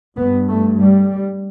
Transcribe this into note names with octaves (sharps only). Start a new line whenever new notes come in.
G2 B3
A3
G3